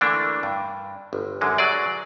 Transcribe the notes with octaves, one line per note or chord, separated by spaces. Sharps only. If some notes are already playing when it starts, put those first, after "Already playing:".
D3 E3 A3 A#3 D4
G2
G1
F#2 D3 G#3
F#3 G#4 D5